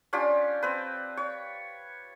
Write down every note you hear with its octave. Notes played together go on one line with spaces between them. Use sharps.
C#4 D4 F4 G4
C4 B4
C#5